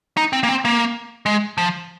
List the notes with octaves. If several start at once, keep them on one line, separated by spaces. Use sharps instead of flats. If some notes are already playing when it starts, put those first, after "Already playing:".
D#4
C4
A#3
C4
A#3
G#3
F3